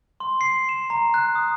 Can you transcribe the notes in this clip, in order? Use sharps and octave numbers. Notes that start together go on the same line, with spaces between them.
C6
C7
E7
A#5
F#6
D#6